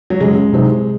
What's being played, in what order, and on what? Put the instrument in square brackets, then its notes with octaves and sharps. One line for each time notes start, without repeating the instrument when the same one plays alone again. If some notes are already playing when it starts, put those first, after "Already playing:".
[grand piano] F#3
[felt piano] F#2 C#3 F#3 C#4 [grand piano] G#3
[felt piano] C2 C3 F#3 C4 D#4